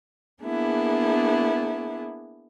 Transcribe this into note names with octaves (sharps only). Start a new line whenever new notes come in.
A#3 B3 D4 E4 G#4